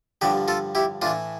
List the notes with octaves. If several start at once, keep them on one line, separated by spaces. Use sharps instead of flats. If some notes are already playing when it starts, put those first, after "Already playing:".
G2 D3 F3 G4 B4
F4 A4
E4 G4
A2 E3 D4 F4